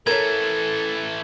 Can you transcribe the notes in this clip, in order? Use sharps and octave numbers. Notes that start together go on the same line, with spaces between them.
E3 A3 A4 A#4 C#5 G#6